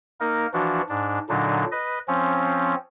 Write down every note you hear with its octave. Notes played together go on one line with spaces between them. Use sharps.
A#3 D#4 A#4
E3 F3 D4 F#4
G#2 D4
A#2 D3 F#3 D4 D#4
B4 D#5
F3 C4 C#4